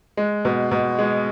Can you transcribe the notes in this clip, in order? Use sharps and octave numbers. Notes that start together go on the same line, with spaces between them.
G#3
B2
B2
G#3